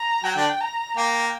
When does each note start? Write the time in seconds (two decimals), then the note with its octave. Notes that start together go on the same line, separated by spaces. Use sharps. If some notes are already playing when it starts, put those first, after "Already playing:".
Already playing: A#5
0.23 F#3 F#4 G5
0.36 D3 D4
0.61 A#5
0.97 A#3 G5